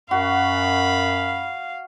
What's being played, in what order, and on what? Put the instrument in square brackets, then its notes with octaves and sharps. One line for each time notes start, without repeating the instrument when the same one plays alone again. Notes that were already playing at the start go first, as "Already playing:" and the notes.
[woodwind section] F#2 [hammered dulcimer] F#4 [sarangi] F5 [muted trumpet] B5